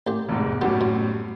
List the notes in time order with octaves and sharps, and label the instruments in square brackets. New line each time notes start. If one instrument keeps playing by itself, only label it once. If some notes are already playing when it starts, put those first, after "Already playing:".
[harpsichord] A1 G4
[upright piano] F1 E2 G#2
[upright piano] F#2 A2 G3 [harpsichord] B3 G4
[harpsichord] B2